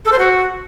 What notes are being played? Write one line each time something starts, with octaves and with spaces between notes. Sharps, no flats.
A4
C5
F#4